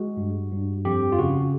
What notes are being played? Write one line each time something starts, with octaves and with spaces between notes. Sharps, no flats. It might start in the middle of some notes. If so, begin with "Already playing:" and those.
Already playing: G#3 F#4
G2
G2
F2 G4
F4
C#3 F#4